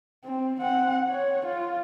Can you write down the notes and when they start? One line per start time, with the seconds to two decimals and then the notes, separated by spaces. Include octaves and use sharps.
0.25 C4
0.61 C4 F#5
1.10 C#5
1.46 F4